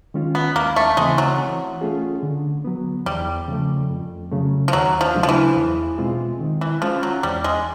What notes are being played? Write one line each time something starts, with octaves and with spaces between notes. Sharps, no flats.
D#3 G#3 C#4 F4
B3
D#2 A#3
A3
C#3 E3 G#3 A3 C4
F#3
E3
A3 C#4 F4 G#4
D3
F#3 B3
E2 G3
C#3 F3 A3
F2
C#3 F#3 A3
F3
D#2 F#3
F3
C#3 F#3 A3 D4
F3
E3
E2
B2 G#3 C4 F4
D#3
E3
F3 G#3 C#4 F4
F#3
E2 G3
G#3